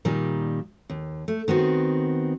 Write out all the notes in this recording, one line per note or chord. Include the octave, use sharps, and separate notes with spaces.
A#2 D#3 G3
D#2
A3
D#3 B3 C4 F#4